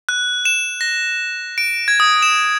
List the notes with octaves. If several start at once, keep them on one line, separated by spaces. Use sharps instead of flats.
F#6
E7
A#6
D7
G#6
D#6
E7